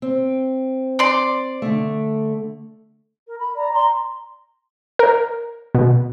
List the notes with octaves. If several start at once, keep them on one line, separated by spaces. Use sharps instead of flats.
C4
D5 C6
D3 A3
A#4
B5
D5 A#5
A#5 C6
A#4
B2